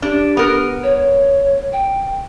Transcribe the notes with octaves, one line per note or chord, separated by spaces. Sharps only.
D4 G4
B3 A#4
C#5
G5